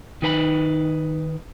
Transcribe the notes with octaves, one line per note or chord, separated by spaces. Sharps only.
D#3 D#4 B4 G5 B5